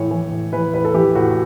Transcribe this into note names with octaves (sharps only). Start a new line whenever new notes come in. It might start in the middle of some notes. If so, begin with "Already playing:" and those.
Already playing: A2 E3 C#5
E3
A2
E3 B4
A2 B4
A4
E3 G4
A2 F#4